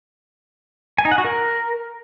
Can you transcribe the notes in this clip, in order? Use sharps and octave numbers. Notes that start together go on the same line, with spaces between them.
G#5
D#4
F#5
F#4
A#4